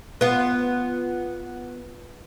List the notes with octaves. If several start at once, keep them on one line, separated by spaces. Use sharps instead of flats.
B3 F4